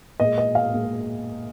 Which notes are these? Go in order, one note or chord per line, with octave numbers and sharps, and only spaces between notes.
A#2 G#3 D#5
D#5
F5
A#2 G#3